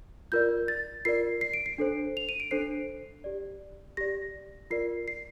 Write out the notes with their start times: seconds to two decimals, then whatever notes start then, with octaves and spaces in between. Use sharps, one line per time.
0.32 F4 A#4 D5 G6
0.68 A6
1.05 F4 A#4 D5 C7
1.41 C7
1.54 D7
1.66 C7
1.78 D4 A4 C5
2.17 F7
2.29 D#7
2.40 D7
2.51 D4 A4 C5 C7
3.24 G4 D5
3.97 G4 D5 A#6
4.71 F4 A#4 D5 C7
5.08 C7